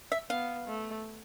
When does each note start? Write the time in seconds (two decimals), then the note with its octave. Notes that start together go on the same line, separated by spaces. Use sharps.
0.12 E5
0.30 B3 F5
0.68 A3